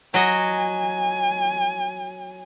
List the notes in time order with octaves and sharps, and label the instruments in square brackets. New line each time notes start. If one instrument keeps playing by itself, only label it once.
[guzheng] F#3 F#4 D#5 [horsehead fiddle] G#5